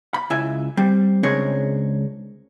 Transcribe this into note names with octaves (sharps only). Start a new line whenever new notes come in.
B5
C#2 E4 E5 G#5
G3 C4
C#2 G#3 C4 D4 A#4 C#5